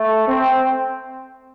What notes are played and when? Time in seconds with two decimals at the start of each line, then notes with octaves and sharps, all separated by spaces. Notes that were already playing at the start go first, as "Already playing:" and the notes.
Already playing: A3
0.29 C4